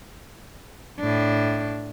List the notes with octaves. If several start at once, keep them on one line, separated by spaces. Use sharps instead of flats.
A2 D4